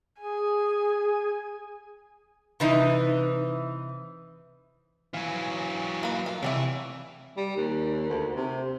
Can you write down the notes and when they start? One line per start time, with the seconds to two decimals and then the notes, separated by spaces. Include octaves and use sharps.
0.20 G#4 G#5
2.60 C3 E3 D#4
5.14 E3 F#3 F5 G#5
6.03 A#3 B4
6.26 F4
6.43 C3 E3 F#3 G3 A3
7.37 G3
7.56 D#2
8.09 D2
8.36 C3